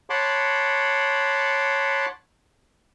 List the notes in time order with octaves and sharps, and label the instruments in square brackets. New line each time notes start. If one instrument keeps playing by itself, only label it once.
[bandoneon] C#5 F#5 A5 B5 C6 D6